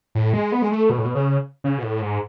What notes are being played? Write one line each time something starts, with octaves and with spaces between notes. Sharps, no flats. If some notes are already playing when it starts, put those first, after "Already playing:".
A2
G#3
B3
G#3
A3
B2
A2
B2
C#3
C#3
B2
A2
G#2